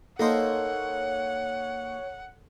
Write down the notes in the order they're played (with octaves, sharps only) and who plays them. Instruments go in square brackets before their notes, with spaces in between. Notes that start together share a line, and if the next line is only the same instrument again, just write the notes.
[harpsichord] A#3 D#4 C5 [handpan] A4 [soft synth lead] C#5 [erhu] F#5